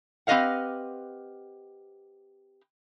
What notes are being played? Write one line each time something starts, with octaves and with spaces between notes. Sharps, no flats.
C4 G4 B4 D#5 F5 F#5